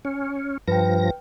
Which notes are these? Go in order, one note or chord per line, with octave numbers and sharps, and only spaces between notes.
C#4
G2 F3 B4 G5 A#6